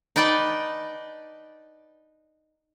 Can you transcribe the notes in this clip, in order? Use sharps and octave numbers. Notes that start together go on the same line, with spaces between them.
D#4 B4 D5 G5 A5